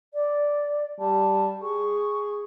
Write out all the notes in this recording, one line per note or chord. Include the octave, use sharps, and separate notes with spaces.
D5
G3 A5
G#4 C#6